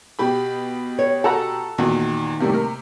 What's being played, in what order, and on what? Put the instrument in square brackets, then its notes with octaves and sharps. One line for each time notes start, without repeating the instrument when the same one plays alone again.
[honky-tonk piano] B2 G4 B5
[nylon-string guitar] C#5
[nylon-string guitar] F#4 [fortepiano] A4 F#5 A#5
[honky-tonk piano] E2 A#2 F#4 [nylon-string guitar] D#3
[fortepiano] A2 G3 A#3 [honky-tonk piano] C3
[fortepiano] A#4